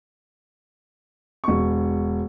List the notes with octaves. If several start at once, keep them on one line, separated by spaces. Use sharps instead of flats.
E1 C#6